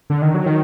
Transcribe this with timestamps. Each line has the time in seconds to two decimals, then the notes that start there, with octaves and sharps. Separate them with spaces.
0.10 D3
0.22 D#3
0.34 F#3
0.46 D#3